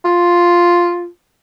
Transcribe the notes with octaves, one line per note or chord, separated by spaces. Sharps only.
F4